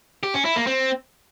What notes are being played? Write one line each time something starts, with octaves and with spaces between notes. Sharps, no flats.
G4
C#4
E4
A#3
C4